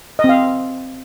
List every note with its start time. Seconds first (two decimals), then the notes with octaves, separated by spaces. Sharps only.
0.19 D#5
0.24 C4
0.29 F5